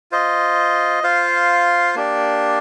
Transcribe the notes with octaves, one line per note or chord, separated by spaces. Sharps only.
F4 C5 D#5
F4 C5 F5
A#3 D4 G4 D5